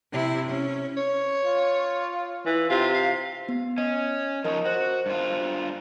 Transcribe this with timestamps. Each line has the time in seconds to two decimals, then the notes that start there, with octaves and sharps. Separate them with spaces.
0.12 C3 E4
0.48 C#4
0.97 C#5
1.45 F4
2.46 E3
2.70 C3 F4
2.94 F5
3.49 B3
3.78 C#4 D#5
4.44 F3 D#4 A#4 C#5 D#5
4.66 F#4 C5 F#6
5.06 G2 F4